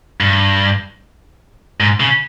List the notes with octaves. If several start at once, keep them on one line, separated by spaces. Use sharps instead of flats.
G2
G#2
C#3